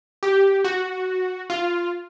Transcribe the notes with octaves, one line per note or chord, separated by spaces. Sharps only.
G4
F#4
F4